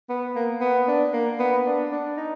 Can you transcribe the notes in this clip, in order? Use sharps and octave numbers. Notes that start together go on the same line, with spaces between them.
B3
A#3
B3
D4
A#3
B3
D4
D4
D#4